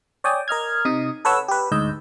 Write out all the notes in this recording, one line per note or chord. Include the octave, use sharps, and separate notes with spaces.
C#5 D5 G5 G#5 D#6
A#4 D#5 F6 G#6
C3 D#4 D#6
A4 B4 C#5 F#5 E6
G4 B4
D2 G#2 D#5 E6 G6